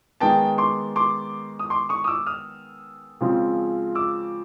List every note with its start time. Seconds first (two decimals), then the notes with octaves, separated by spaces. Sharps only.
0.20 D#3 G#3 B3 G5 A5
0.58 C6 D6
0.96 C6 D6
1.59 D#6
1.70 C6 D6
1.89 C#6 D#6
2.04 D#6
2.07 D6 E6
2.26 D#6 F6
3.21 C#3 F3 G#3 C4
3.95 D6 E6